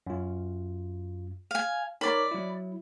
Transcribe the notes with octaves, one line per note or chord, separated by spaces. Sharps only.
F#2 F4
F5 G#5
D#4 A#4 C#5 D5 B5
F#3 E4